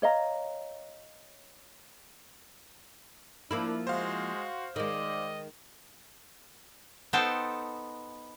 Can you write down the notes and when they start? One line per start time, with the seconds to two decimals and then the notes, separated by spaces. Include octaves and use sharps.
0.02 C#5 D#5 F5 A#5
3.51 F3 A#3 D4 E4
3.87 G#3 F#4 C5 F5
4.76 D#3 G#3 D5 D#5
7.13 B3 D#4 A4 C5 G5 A5